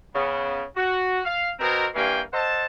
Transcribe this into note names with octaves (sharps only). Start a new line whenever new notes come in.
C#3 B3
F#4
F5
B2 C4 A#4
G2 E3 A#3 F5 G5 G#5
A4 C5 D#5 F#5 A5